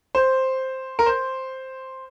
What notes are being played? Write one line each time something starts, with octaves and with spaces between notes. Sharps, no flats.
C5
A#4
C5